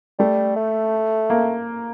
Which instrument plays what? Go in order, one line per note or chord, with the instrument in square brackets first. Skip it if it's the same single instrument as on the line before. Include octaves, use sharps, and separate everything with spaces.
[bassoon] G3 [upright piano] A3
[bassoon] A3
[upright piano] A#3